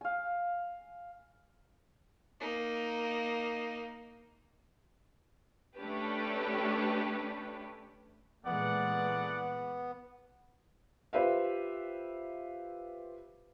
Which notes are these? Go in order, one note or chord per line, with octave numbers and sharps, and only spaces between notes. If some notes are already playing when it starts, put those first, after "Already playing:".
F5 G#5
A#3 D#4
A3 C#4 D4 G4 B4
A#2 E3 G#3 A3 B3 D5 F#5
F4 G4 B4 C5 E5 F5